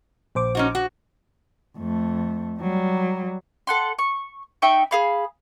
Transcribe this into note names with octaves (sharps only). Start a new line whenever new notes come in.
A#1 C5 D6
C#4 D#4 F#4
F#4
F2 A3
F#3 G3
A4 F#5 C6
C#6
D#4 E5 G5 C#6
G#4 F5 B5